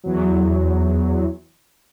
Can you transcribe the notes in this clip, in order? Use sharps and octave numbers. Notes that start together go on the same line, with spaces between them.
E2 F#3